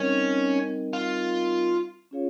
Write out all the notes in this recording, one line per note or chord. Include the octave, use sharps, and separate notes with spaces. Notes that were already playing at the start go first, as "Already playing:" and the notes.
Already playing: G3 C4 C#4 D#4 A#4 D#5
F4
C#4 F4 G#4 C#5 F5